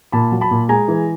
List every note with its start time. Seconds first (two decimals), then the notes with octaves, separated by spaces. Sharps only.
0.12 A#2 A5 B5
0.32 F#3
0.41 A5 B5
0.51 A#2
0.69 G#3 G#5 A#5
0.88 E3